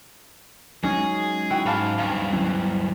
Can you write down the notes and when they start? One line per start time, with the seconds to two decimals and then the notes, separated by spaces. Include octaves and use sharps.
0.84 F#3 G#3 C#4 D#4 G#4
1.50 E4 F#4 G5
1.66 G#2 F5 A5 B5
1.98 D2 G2 F5 B6
2.33 F#3 C#4 E4